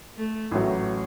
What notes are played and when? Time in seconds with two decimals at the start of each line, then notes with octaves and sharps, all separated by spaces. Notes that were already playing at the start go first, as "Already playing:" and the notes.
0.17 A3
0.51 A1 A2 F#3